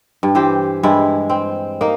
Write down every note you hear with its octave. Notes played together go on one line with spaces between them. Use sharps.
G2
E3 G4 C5
G2 G#3 E4
C4
A#3 D#4